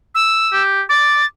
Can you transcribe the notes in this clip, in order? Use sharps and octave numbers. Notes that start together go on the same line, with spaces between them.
E6
G4
D6 A6